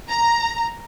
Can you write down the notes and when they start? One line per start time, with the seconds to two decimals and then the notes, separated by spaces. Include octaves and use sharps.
0.10 A#5